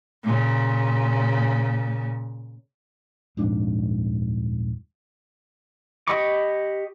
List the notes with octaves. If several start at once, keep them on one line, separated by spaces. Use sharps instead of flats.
A#2 C#3
D#1 F2 G#2 D4
G4 D#5 B5 C#6 D6